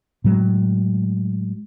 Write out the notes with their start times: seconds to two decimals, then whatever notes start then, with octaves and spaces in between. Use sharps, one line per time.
0.24 A2 F#3 G#3